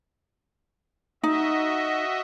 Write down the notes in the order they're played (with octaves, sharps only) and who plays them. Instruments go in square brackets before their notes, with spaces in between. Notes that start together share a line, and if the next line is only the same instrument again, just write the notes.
[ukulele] D#4 [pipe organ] F#4 D#5 E5